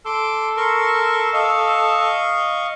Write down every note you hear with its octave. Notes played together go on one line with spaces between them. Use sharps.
A4 C6 D6
A#4 C6 C#6
D#5 F5 C#6